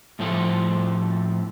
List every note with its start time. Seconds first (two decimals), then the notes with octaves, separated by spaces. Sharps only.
0.19 A2 F3 A3 C4 F4 A4